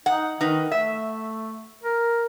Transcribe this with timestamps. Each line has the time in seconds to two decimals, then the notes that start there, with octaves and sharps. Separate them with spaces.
0.06 D#4 F#5
0.41 D#3 D#4 B4
0.72 A3 E5
1.83 A#4